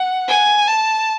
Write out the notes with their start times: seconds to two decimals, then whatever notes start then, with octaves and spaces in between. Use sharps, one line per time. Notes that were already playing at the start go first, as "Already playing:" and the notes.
Already playing: F#5
0.29 G#5
0.68 A5